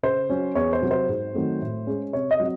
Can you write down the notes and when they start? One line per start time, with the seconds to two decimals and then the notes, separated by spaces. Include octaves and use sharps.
0.03 C#3 C5
0.30 F#3 C#4
0.55 E2 C#5
0.73 C5
0.81 C3 F#3
0.91 C5
1.08 G#2
1.34 D#3 F#3 A3 C4
1.61 A2
1.87 G#3 C#4
2.13 C3 C#5
2.31 D#5
2.40 F#3 C4